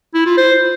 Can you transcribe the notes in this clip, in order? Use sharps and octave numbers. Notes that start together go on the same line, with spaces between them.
E4
F4
C5